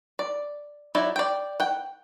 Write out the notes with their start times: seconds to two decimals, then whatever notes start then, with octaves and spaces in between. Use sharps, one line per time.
0.19 D5
0.95 F#3 D#4 E4 D5
1.16 D5 G5
1.60 F#5 G5